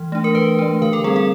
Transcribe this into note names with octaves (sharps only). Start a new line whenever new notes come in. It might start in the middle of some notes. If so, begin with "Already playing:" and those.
Already playing: E3
A3 D4
A#4
E3 B4
A3 D4
D3 A#4
A4
G3 C4 G#4
G#4